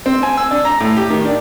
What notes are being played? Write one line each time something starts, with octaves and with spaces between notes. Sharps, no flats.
C4
G#5
E6
D4
A#5
A2
G4
D#3
D4